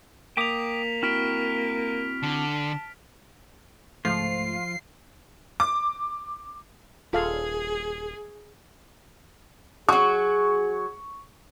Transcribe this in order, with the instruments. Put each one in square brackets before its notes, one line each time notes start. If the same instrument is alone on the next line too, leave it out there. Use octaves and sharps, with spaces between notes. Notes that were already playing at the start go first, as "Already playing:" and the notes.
[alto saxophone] A#3 [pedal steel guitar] G5 D6 D#6 [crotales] B6 F7
[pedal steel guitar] C4 E4 F#4 [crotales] F6 B6 D7
[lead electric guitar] D3 [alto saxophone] A5
[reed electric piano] C#2 G#2 A3 [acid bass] F3 [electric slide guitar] F4 [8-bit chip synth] C7
[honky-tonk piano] D6
[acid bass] D#1 [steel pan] F4 A4 F5 [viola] G#4
[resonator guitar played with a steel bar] F#3 F#4 [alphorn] G#4 [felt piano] C#6